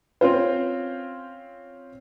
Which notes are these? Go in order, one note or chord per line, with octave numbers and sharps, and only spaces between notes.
C4 C#4 F4 C5